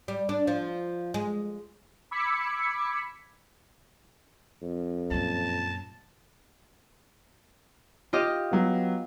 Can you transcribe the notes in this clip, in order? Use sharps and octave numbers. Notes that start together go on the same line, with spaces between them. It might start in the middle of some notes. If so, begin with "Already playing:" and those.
G3
D4
F3
G#3
B5 D6 E6 G#6 B6 C#7
F2
F#2 A#2 A5
F4 G4 D#5
F#3 B3